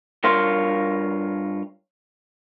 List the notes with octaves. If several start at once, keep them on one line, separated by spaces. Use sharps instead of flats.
G2 F4 A#4 C#5 F5 C6